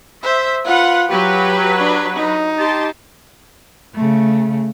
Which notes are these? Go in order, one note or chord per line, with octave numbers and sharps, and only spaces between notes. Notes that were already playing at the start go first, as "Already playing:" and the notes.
C5 E5
F4 B4 F#5
F#3 G4 B4
D4
D#4
G4 A5 C6
C#3 A3